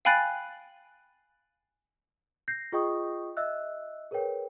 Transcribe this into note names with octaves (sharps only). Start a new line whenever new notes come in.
F5 G5 G#5 B5 F#6 A6
G6 A#6 C7
F4 G#4 D#5 G5 C#6 D#6
D#5 E5 E6 F#6
G#4 A#4 B4 C#5 G5